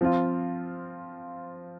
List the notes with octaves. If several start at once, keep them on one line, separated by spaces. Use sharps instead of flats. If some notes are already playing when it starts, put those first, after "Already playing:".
F3 C4 F4